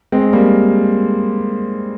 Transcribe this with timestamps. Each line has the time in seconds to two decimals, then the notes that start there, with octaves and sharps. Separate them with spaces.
0.12 G#3 C4
0.33 G3 A#3